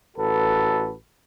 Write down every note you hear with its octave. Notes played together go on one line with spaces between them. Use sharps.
A1 F#4 A4 B4